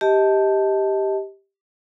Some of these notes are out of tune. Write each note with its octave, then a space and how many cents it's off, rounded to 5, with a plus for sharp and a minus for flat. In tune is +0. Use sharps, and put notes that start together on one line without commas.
G4 +0 D#5 +30 A5 +0